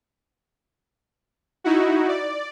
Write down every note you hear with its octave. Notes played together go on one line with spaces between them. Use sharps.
D#4 E4 F#4
D5